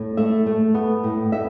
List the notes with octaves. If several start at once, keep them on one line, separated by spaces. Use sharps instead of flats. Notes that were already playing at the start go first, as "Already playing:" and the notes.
Already playing: A2
A3 E5
A3
B3
A2
B3 E5